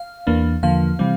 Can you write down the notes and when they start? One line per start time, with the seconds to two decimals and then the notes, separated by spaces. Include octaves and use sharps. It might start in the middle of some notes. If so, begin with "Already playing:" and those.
Already playing: F5
0.27 E2 E3 A#3 D4
0.63 E2 D3 F3 A#3 F5
0.99 C3 E3 G3 C4